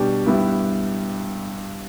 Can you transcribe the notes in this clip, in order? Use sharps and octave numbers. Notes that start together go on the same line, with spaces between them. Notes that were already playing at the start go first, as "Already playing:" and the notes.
Already playing: B2 G3 D4 G4
G2 G3 B3 E4 G4